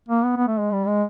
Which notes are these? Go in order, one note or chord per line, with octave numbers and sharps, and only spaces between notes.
A#3
B3
B3
A3
G#3
G3
G#3